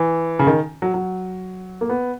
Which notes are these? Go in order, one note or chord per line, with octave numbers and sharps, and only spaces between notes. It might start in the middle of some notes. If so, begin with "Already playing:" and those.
Already playing: E3
C#3
D#3
F#3
F#3
A#3
B3